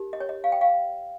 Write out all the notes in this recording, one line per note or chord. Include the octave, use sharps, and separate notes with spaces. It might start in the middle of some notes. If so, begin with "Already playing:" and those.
Already playing: D#4 G4 A#4
D#5
C#5
D#5
F5
G5
F5